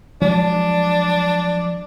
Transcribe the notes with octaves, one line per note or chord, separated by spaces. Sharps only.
F3 F#3 G#3 D4